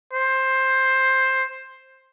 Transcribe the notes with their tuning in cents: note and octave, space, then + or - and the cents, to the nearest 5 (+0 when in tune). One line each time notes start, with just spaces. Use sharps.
C5 +10